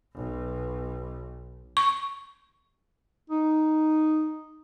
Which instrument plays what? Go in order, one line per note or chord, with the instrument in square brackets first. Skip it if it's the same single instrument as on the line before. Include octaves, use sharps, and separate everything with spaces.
[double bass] B1 B2
[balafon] C#6
[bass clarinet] D#4